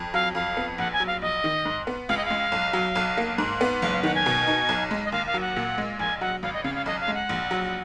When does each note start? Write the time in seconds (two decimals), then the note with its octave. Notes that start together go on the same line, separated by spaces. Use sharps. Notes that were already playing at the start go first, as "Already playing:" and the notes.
Already playing: F2
0.14 F#3 F5
0.35 F2 F5
0.57 B3
0.78 A#1 F#5
0.93 G#5
1.00 F#3
1.07 F5
1.22 A#1 D#5
1.44 D#3
1.65 G#2
1.87 B3
2.09 C#2 F5
2.17 D#5
2.25 F5
2.30 G#3
2.52 B1
2.73 F#3
2.95 B1
3.18 A#3
3.38 G#2
3.61 B3
3.82 F#1 F5
3.89 F#5
3.93 F5
4.03 D#3 F#5
4.15 G#5
4.26 B2
4.47 D#4
4.69 B1
4.91 G#3
5.05 D#5
5.12 D#2 F5
5.27 F5
5.34 F#3
5.41 F#5
5.56 A#2
5.78 G#3
5.99 A#1 G#5
6.21 F#3 F#5
6.43 G#1 F5
6.54 D#5
6.64 C#3 F5
6.75 F5
6.86 B1 D#5
7.01 F5
7.08 G#3
7.14 F#5
7.29 A#1
7.51 F#3